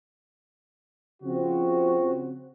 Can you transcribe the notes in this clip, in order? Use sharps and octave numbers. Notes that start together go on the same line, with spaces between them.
C#3 F3 C4 F#4